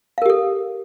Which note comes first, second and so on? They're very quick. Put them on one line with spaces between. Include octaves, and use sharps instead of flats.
F5 A#4 G4 A4